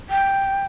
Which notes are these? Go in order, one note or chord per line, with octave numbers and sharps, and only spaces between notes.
G5